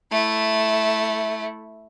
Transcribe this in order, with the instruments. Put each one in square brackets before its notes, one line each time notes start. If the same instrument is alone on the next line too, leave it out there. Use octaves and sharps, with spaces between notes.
[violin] A3 E4